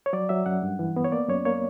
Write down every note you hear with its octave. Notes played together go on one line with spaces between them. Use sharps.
C#5
F#3 D5
F#3 E5
F#2 F#5
G2
E3
B3
C#5
A#3 D5
F#2 C#5
A#3 C#5